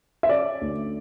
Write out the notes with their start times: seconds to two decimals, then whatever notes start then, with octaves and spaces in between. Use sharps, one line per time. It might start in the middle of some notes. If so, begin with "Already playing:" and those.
0.23 E5
0.29 C#4 D5
0.61 D2